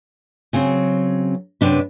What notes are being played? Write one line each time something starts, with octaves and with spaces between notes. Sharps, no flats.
C#3 F#3 C4
F#2 C3 D4 B4